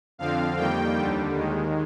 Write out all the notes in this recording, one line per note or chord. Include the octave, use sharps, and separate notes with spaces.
F2 D3 F3 C4 F5
F2 D#3 G3 A#3 G5
D#2 D3 G3
D#2 D#3 G#3